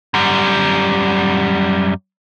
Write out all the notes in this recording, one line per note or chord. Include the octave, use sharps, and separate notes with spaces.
F#2 G3